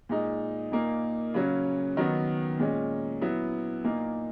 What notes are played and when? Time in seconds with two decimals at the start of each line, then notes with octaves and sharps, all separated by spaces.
0.09 A#2 G#3 D#4
0.72 A#2 A#3 D#4
1.34 C#3 F#3 C#4
1.97 D#3 F#3 B3
2.59 A#2 G#3 C#4
3.21 F#3 B3 E4
3.84 A#2 A#3 D#4